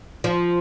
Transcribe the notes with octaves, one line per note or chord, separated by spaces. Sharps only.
F3